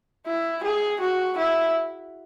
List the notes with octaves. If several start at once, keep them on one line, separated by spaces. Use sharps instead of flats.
E4
G#4
F#4
E4